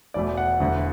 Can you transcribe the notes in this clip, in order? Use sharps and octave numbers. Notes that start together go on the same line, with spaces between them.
E1 E2 B2 A3 D5
F#5
E1 D2 D3